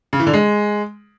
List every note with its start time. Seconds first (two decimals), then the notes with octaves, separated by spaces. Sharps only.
0.13 C#3
0.20 E3
0.27 D3
0.33 G#3